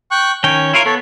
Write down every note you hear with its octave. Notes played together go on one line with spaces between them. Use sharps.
G5 C#6 F#6
D#3 C#4 C#5 G5
E4 F4 A#4 C#5 F5
B3 A4 C#5